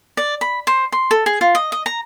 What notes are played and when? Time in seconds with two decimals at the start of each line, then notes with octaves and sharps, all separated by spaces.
0.17 D5
0.41 B5
0.67 C5
0.92 C6
1.11 A4
1.26 G#4
1.41 F4
1.55 D#5
1.72 D#5
1.86 A#5